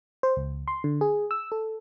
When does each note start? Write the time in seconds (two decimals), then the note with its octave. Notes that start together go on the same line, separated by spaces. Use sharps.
0.23 C5
0.36 C#2
0.68 C6
0.84 D3
1.01 G#4
1.31 E6
1.52 A4